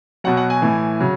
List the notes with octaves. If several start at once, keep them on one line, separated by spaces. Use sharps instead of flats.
B2 F#3 F#5
F#5
G#5
A2 E3
C#3 F#3